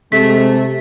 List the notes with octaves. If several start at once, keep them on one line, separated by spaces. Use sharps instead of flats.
C3 G#3 A3 B6